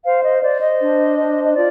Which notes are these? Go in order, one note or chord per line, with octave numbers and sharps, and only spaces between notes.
C5 F5
D#5
C5 D5
D#5
D4
C5
D#5
F4 D5